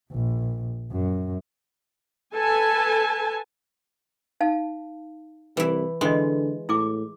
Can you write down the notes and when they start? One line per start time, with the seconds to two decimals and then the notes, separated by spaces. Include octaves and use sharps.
0.11 A#1
0.91 F#2
2.34 A4 B4 G#5 A5
4.40 D#4 F5 A5
5.57 C2 E3 E4
6.01 D3 E3 G#3 D#5 C6
6.69 A2 E4 G#4 D6